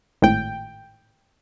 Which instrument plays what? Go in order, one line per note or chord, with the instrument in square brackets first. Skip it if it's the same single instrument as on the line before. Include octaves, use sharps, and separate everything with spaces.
[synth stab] G#1 A2 G5